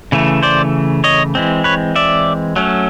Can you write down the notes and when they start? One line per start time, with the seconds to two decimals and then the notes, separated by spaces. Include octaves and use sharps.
0.12 C#3 E3 A3
0.43 C5 D5
1.04 C#5 D#5
1.35 E3 G#3 C4
1.64 B4 C#5
1.96 D5 E5
2.56 F#3 A3 C#4